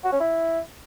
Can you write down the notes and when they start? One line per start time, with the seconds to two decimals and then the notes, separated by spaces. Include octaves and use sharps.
0.04 F#4
0.12 C#4
0.20 E4